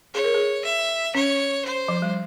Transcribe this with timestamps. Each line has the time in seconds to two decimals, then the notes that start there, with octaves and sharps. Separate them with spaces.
0.14 G#4 C#5
0.24 A#4
0.34 G#4
0.65 E5
1.15 C#4 C#5
1.65 C5
1.88 F3
2.02 G3